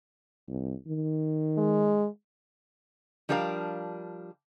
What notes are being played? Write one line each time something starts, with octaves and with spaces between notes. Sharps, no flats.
C2
D#3
G#3
F3 G3 D4 A#4 B4 F5